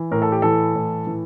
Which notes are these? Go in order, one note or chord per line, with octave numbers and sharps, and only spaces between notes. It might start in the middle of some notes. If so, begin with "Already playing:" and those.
Already playing: E3
A2 A#4
A4
G4
E3 A4
A2
E3